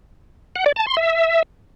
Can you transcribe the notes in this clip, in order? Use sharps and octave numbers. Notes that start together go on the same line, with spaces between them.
F#5
D5
A5
C6
E5